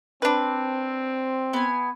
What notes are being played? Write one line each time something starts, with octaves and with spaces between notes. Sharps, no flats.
C4 D4 B4
B3 G#5